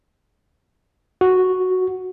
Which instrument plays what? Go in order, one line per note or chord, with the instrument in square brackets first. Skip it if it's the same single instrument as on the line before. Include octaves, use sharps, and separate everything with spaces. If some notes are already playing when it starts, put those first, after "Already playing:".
[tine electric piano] F#4